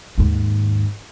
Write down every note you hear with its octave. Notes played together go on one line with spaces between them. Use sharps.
D#2 G#2